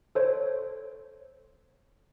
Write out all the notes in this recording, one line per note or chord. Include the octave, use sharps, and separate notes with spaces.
A4 C5 C#5